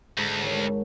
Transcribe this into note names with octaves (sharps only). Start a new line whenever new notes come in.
D2 G#2
G#1 C#5